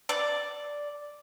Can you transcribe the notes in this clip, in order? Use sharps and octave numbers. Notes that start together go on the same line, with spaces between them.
D5